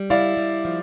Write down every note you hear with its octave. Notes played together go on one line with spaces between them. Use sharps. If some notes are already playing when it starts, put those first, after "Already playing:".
Already playing: G3
E4 D5 F5
G3
F3